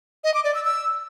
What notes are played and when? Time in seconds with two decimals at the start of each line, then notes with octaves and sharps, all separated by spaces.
0.24 D#5
0.34 D6
0.44 D5
0.55 E6
0.65 E6